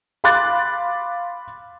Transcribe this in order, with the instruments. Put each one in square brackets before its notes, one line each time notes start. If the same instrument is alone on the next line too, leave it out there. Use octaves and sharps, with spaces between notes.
[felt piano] F5 B5 C6 D6 F#6 A6